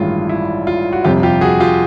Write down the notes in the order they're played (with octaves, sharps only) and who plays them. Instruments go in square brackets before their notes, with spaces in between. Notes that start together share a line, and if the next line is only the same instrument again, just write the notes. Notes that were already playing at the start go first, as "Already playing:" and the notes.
Already playing: [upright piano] A1 G2 D#3 G#3 [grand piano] E4 F4
[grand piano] E4
F4
F#4
[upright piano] G1 F2 C3 [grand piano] F4 G4
[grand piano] F4 G4
F#4 G#4
F4 G4